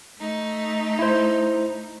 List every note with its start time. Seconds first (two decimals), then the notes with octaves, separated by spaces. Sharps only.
0.17 A3 D#4
0.99 E4 C5